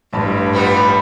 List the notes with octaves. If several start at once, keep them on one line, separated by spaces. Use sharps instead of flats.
A1 G2 A5 B5
F3 G3 B3